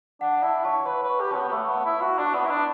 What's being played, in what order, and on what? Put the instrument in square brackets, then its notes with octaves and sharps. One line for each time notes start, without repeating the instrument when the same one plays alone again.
[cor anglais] D4 [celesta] F#5
[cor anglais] E4 [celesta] A5
[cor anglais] C#5 [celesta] A5
[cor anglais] B4 [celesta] C#5
[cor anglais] B4
[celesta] C#6
[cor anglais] G4
[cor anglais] C#4 [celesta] A5
[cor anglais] B3
B3
[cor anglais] A3 [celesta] A5
[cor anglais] B3
[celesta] A5
[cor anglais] E4
[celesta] A5
[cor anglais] F#4
[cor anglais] D4 [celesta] C#6
[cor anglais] B3
[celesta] C#6
[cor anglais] E4
D4